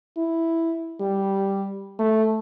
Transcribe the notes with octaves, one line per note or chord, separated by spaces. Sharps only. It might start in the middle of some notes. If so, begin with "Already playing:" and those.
E4
G3
A3